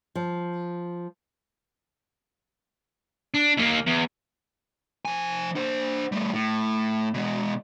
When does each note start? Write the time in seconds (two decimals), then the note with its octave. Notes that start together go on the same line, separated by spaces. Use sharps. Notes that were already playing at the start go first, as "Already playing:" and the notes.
0.15 F3
3.34 D4
3.57 D#2 A#3
3.86 E2
5.05 F3 G#5
5.55 D4 C5
6.12 G3 A3
6.34 A2
7.14 B2 G#3